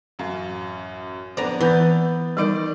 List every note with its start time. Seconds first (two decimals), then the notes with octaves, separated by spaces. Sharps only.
0.19 A1 F#2 F5
1.37 F2 B3 D4 C5 D5 A#5
1.61 E3 B3 B5 G6 A6
2.37 D#3 G3 D#4 A#4 D5 D7